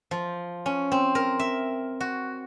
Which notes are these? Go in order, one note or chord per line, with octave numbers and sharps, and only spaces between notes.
F3
C#4
C4
A#4
E5
F#4